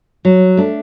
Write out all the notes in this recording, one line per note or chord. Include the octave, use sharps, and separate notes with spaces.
F#3
A3 D4